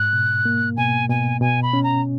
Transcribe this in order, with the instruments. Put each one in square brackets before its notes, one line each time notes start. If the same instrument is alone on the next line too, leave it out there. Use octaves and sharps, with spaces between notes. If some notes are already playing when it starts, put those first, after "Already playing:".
Already playing: [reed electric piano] G#2 [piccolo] F#6
[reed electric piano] B2
A#3
[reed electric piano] B2 [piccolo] G#5
[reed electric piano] B2 [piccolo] G#5
[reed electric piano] B2 [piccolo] G#5
[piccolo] B5
[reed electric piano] C#4
[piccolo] A#5